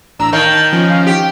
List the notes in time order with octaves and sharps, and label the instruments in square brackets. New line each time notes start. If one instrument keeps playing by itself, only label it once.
[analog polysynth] A1 D4 E6 [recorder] A#5
[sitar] D#3 [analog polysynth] C#5 F5 A5 [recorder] G6
[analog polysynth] A5 A6
F3 C#4
[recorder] F5
[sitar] G4 [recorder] G5